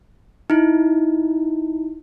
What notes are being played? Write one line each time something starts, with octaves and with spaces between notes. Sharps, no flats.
D#4 E4